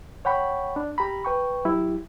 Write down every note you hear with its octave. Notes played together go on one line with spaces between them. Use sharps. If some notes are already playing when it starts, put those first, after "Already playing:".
C#5 F#5 G5 B5 C#6
D4
G4 A#5 B5
B4 G5 C#6
F#3 E4 G4